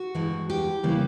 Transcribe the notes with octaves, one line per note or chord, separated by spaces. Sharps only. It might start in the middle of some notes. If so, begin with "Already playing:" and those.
Already playing: F#4
G2 E3 G#3
G4
C#3 E3 G3 A#3